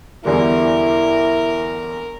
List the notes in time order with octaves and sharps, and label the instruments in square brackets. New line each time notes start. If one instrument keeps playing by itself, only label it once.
[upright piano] E2 D3 G3 [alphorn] E4 [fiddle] A#4